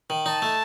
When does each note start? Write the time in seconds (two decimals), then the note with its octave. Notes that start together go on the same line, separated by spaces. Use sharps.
0.10 D#3
0.26 D#4 A5
0.42 A3